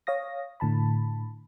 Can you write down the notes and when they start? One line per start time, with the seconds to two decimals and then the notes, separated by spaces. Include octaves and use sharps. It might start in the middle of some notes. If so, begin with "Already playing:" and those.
0.07 C#5 F5 D#6 A#6
0.60 A2 D3 A5 B5